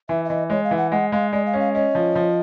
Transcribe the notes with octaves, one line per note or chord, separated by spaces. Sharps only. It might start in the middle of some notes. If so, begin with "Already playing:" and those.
E3 E5
E5
E3 D#5
G#3 C#5
F5
E3
F#5
G#3 F#5
G#3 F5
G#3 D5
F5
C#4
F5
C#4 D#5
F3
F3